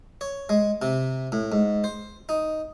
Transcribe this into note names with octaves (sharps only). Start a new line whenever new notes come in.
C#5
G#3
C3
A2
G#2
C5
D#4